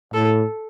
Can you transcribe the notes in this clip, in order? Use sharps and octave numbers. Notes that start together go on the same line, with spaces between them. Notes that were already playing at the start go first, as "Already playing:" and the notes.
A2 A4